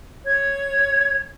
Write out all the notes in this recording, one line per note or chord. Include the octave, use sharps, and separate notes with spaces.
C#5 G#6